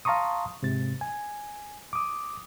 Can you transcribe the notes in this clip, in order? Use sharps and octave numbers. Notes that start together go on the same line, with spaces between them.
F5 A5 A#5 C6 C#6 D#6
G#2 C3 A6
G#5
D6 D#6